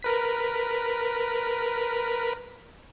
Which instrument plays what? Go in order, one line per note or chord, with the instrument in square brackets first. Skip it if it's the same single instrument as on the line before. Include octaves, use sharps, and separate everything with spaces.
[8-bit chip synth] A#4 B4 B6